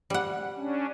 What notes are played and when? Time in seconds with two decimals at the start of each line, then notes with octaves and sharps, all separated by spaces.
0.10 G3 F#5
0.56 C#4 D4